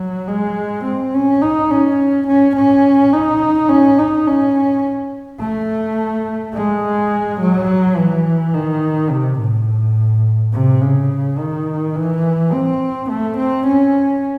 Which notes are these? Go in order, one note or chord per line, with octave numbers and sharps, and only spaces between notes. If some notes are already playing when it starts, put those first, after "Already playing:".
Already playing: F#3
G#3
C4
C#4
D#4
C#4
C#4
C#4
D#4
C#4
D#4
C#4
A3
G#3
F#3
E3
D#3
C3
A2
C3
C#3
D#3
E3
C4
A3
C4
C#4